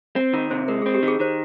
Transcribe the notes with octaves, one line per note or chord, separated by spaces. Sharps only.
C4
D#3 A#4
C3 C5
G#3 A#4
C4 G#4
G4
D#3
G#4
D#3 C5